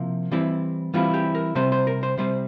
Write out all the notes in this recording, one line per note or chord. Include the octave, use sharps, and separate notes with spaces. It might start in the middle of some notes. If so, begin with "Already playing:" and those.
Already playing: C3 F3 A#3 E4
E3 G3 C4 E4
E3 G3 C4 E4 F4
G4
A#4
C3 G3 C4 C5
C5
A#4
C5
C3 G3 C4 C5